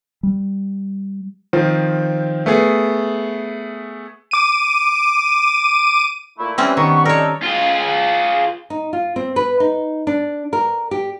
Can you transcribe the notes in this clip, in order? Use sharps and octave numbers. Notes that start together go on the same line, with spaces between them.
G3
D#3 F3 C4
A3 B3 G#4
D6 D#7
A#2 A3 E4
E3 G3 C4 C#4
D#3 B3 C#6
D4 D#4 A4 A#4 C#5
F4 G#4
D#4
F4
C4
B4
D#4
D4
A#4
G4